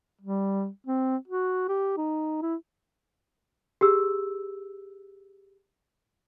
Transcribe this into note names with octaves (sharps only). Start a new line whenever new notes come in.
G3
C4
F#4
G4
D#4
E4
G4 G#4 E6